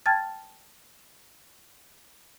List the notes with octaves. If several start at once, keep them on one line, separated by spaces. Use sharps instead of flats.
G5 A5 F6 G#6 A6